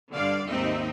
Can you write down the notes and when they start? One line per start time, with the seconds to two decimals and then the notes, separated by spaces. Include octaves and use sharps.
0.13 G2 D3 D4 D5 F5
0.48 D#2 G#2 C4 D#4 D#5 E5